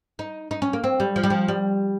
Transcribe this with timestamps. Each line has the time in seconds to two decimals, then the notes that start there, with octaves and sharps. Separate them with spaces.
0.19 D#4
0.51 D#4
0.62 C#4
0.73 A#3
0.84 C4
1.00 G3
1.16 F3
1.23 G3
1.30 F3
1.48 G3